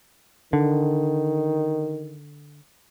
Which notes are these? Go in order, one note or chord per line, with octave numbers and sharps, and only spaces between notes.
D3 D#3